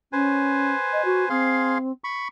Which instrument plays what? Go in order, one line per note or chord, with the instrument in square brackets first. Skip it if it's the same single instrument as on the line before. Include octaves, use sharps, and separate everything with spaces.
[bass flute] C#4 [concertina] B4 C5 G#5
[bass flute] D#5
F#4
[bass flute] C4 [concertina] G#4 F5 C6
[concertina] B5 C#6